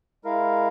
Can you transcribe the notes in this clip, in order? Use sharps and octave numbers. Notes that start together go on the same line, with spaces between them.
G#3 E4 A#4 F5